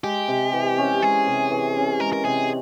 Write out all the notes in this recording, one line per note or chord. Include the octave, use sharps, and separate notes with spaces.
G#3 G4
C3
E3
C#4
G#3 G#4
C3
E3
C#4
G#3 A#4
A#4
C3 G#4